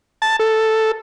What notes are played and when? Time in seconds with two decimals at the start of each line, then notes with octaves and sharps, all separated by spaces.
0.22 A5
0.39 A4